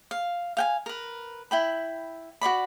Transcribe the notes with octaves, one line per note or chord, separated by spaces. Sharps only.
F5
F5 G5 G#5
A#4 B4
E4 G5 B5
F#4 C5 D5 B5